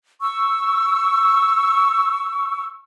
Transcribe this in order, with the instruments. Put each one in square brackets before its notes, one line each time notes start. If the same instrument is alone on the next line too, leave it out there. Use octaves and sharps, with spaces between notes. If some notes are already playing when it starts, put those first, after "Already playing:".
[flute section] C#6 E6